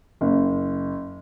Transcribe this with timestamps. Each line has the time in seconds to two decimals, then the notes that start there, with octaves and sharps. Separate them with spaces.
0.21 F#1